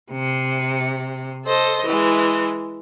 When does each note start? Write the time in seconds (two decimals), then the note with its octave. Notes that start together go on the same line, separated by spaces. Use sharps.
0.11 C3
1.46 A4 C5 D#5
1.86 E3 G#3